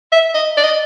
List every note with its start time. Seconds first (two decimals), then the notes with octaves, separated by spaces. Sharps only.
0.12 E5
0.34 D#5
0.57 D5
0.63 D#5